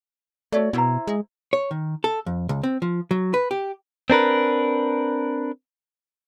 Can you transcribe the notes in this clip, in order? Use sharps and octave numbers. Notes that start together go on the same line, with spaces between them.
A3 F#4 C#5 D5
B2 E4 C5 A#5
G#3
C#5
D#3
A4
F2
C#2
C4
F3
F#3
B4
G4
C4 D4 A#4 B4